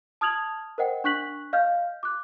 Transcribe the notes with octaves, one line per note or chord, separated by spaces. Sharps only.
A5 D#6 F6 G#6 F7 F#7
A#4 C5 D#5 F#5 G5
D4 C#6 F#6 B6 F#7
D#5 F5 F6 G6
D6 F#6